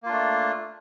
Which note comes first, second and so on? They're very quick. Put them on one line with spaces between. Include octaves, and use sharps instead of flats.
A#3 F4 D4 A3